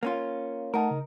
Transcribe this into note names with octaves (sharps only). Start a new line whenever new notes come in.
A#3 C#4 F4
A3 D#4 A#4 F#5 A5
C#3